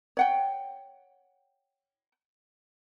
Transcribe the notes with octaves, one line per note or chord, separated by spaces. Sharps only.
C#5 F#5 G5